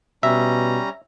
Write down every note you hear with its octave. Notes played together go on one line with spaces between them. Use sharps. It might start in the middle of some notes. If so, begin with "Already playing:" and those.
B2 G3 C#4 E5 A#5